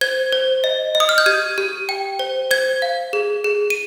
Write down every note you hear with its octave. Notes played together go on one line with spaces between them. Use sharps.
C5 G#6
C5
D#5
D#5
D#6
F6
G6
G4 G#6
G4
G5
C5
C5 G#6
F5
G#4
G#4
D#7